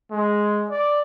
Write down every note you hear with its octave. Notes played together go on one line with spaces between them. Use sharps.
G#3
D5